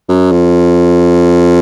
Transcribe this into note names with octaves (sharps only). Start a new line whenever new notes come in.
F#2
F2